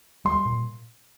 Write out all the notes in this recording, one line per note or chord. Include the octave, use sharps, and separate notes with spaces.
G3 C6
A#2